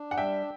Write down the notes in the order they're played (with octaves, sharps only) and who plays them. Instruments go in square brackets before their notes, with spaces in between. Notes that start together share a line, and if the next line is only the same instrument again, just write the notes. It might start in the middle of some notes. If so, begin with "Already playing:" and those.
Already playing: [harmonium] D4
[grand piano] F#5
[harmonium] G3 [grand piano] E5 G5